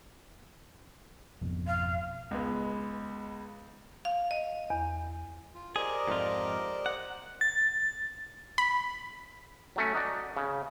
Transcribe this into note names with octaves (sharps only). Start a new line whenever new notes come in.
G#1 F2 B2
F5
C#2 G#3 B3
F5
D#5
E2
F4
G4 G#4 A#4 C5 D5 D#5
F2 G#2 F4
F#5
A6
B5
F#3 A3 C#4
D#4 F#4 D5
C#3